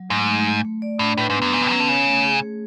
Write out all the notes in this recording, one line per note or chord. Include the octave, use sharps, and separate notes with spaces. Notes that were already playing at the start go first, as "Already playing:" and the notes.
Already playing: F#3
G#2 A3
A3
A3
A3
D5
A2 D4
A2 B4
G#2
B3
F#2
G#2 B4
B2
F#3 C#4
D3
C#3 C#5
A3
G#4
A3